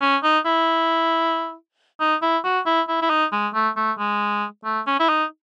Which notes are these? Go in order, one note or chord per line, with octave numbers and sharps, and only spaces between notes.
C#4
D#4
E4
D#4
E4
F#4
E4
E4
E4
D#4
G#3
A3
A3
G#3
A3
C#4
E4
D#4